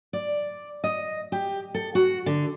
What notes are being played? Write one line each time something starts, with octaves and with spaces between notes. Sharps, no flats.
D5
D#5
G4
A4
F#4
D3